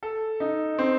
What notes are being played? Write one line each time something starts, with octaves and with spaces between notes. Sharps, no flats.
A4
D#4
C4